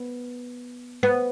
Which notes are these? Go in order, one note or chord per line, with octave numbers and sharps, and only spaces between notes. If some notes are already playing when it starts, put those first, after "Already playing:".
Already playing: B3
B3